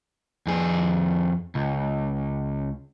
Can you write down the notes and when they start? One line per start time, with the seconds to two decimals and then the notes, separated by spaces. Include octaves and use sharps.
0.47 F2 G#4
1.55 C#2